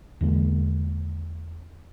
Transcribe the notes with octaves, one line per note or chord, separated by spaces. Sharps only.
E2 D3 G#3 A#3